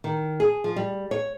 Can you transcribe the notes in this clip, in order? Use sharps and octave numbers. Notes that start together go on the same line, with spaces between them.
D#3
G#4
F3
G3
C#5